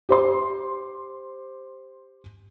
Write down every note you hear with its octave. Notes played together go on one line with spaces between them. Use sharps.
G4 C5 C6